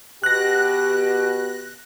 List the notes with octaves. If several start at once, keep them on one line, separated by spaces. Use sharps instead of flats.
B2 G4 F#6 A#6